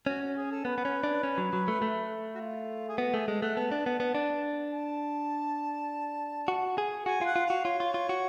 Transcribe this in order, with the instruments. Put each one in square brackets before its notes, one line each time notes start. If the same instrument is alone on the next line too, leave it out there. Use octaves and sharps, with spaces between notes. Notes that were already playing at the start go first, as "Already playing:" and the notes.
[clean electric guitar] C#4 [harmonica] F#4
[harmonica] F#4
G#4
A4
[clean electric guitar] B3 [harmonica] B4
[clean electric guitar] B3
C#4
D4
C#4
F#3
F#3
A3
A3
[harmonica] F#4
F4
G#4
[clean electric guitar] B3 [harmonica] F#4
[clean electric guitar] A3 [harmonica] G#4
[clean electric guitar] G#3 [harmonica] A4
[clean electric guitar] A3 [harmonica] F#5
[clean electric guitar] B3 [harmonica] A5
[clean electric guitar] D4
B3
B3
D4
[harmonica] A5
[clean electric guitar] F#4
G#4
[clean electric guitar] F#4 [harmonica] G#5
[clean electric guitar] F4 [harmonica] F#5
[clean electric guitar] F4
[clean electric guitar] F#4 [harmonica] F5
[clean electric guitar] F4 [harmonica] C#5
[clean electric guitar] F4
F4
F#4